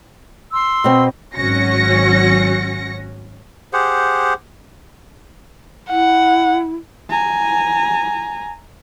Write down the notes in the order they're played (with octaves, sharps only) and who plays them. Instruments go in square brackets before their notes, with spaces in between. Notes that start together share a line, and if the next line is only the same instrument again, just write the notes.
[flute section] C6 E6
[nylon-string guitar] B2 C4
[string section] G#1 F#3 C#4 F#4 A#6 C#7
[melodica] G4 G#4 C5 F#5
[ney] E4 [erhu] F#5
[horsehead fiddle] G#5 A#5